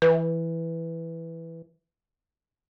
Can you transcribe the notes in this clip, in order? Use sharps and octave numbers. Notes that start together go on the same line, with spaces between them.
E3 B4